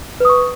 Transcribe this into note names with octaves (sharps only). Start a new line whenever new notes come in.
B4 C#6 D#6